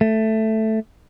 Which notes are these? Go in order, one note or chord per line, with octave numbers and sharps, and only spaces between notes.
A3